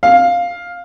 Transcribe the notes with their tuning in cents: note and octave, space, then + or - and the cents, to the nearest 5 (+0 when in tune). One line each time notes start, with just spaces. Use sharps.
F5 +5